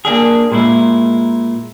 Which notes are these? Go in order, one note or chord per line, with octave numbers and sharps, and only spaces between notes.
A#3 D4 G#4
A#2 G#3 E4